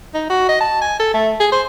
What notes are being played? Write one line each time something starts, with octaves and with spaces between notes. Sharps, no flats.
D#4
F#4
D#5
A5
G#5
A4
A3
G#4
C5